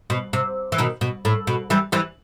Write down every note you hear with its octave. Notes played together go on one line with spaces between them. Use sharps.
B2
C3
E3
B2 D#3
B2
A2
B2
E3 G3
E3 G3